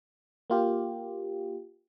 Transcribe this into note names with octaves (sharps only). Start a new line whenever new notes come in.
A#3 F4 G4